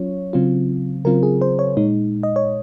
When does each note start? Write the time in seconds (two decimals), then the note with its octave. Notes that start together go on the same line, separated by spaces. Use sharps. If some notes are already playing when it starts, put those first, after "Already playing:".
Already playing: F#3 C#4 F4 C#5
0.33 C#3 F#3 C4 F4
1.05 C#3 F#3 C4 F4 A#4
1.23 G#4
1.41 C5
1.59 C#5
1.77 A#2 G#3 D#4
2.23 D#5
2.36 C#5